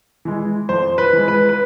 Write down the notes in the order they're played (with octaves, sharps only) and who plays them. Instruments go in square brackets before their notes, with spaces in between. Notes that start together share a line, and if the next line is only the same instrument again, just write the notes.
[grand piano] E3 G#3
F2 C5
B4
E3 G#3
B4
B4